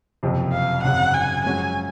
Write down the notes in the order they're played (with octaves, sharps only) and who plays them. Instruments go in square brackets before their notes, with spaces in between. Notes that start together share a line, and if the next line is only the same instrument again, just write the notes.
[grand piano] F#1 F2 C3 F3
[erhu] F5
[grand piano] G#1 F#2 C#3 F#3 [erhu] F#5
[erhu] G#5
[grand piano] F#2 F3 G#3 C#4 F#4 [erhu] G#5